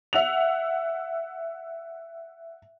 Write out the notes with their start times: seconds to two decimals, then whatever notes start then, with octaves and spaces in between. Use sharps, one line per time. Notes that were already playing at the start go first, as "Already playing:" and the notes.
0.13 E5 F#5 F7